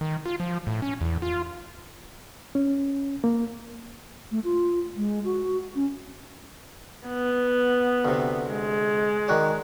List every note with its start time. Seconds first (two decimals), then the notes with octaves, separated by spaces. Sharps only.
0.01 D#3
0.26 F4
0.40 F3
0.67 A2
0.82 C#4
1.01 E2
1.22 F4
2.55 C#4
3.24 A#3
4.31 A3
4.44 F4
4.96 G#3
5.25 F#4
5.75 C#4
7.08 B3
8.05 D2 C3
8.50 G#3
9.28 D#3 F#4 D5